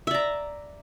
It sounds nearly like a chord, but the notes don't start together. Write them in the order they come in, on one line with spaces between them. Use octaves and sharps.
E5 D5 A#5